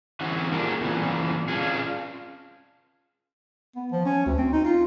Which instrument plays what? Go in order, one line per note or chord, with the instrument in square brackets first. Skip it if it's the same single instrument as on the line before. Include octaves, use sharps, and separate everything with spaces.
[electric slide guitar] E3 C#4 F#4
A#3 D4 F4 G4 G#4 A#4
F#2 A#2 E3
C#4 D4 F4 G#4
[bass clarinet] B3
F3
C#4
D2
C4
D#4
F4